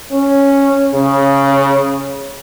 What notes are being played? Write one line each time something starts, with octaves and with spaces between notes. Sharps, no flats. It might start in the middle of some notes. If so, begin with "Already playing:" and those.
C#4
C#3